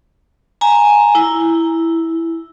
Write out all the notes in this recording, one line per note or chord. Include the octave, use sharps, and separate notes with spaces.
G#5 A#5
E4